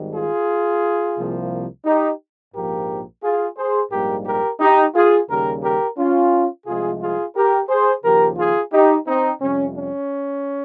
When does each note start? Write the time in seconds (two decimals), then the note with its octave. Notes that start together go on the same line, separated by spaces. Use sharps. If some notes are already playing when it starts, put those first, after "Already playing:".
Already playing: G#1 G#2 D#3 G3
0.14 F4 G#4
1.17 C2 C3 F3 A#3
1.85 D#4 G4
2.54 A#1 G#2 F3 A#3 G4 A#4
3.23 F4 G#4
3.57 G#4 C5
3.91 A#1 G#2 G3 A#3 G4 A#4
4.26 G4 A#4
4.60 D#4 G4
4.95 F4 G#4
5.29 D#2 C#3 G3 G4 A#4
5.63 G4 A#4
5.98 C#4 F4
6.66 C2 C3 F3 G#3 F4 G#4
7.01 F4 G#4
7.35 G4 A#4
7.69 G#4 C5
8.04 D#2 C#3 F3 G4 A#4
8.38 F4 G#4
8.72 D#4 G4
9.07 C4 D#4
9.41 F2 C3 G3 C#4
9.76 C#4